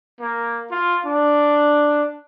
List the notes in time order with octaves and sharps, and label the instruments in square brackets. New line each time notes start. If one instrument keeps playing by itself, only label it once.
[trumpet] A#3
F4
D4